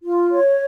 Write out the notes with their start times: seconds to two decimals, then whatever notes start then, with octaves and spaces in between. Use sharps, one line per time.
0.04 F4
0.31 C#5